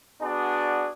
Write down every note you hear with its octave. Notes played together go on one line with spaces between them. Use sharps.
B3 D4 F#4 G#4 D5